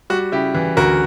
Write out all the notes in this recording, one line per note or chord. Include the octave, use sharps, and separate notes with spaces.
G3 F#4
C#3 E4 G4
E3
D2 F#4 A#4